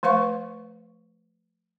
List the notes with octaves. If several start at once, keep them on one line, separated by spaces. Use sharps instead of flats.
F3 A3 B4 F5 C#6